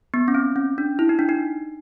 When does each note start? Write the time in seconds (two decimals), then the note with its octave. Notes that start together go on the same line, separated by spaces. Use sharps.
0.14 B3
0.28 C#4
0.35 C4
0.56 C#4
0.78 D4
0.99 E4
1.09 D#4
1.19 D4
1.29 D#4